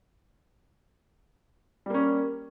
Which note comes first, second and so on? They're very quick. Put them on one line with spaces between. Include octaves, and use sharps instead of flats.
G3 A#3 C#4